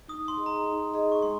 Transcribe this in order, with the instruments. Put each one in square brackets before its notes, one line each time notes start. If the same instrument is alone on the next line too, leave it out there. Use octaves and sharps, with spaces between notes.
[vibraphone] D#4 [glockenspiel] D#6
[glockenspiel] C6
[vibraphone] G#4 D#5
[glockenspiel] A#5
[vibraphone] D#4
G#4 D#5
[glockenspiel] C#6
[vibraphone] G#3 [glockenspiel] C6